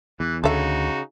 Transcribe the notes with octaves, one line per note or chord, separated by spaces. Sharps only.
E2 E3
D2 C#3 D#4 F#4 A4 E5